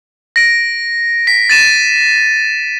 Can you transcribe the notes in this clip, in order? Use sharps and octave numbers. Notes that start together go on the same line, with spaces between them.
A#6 D7
B6
A6 D#7 E7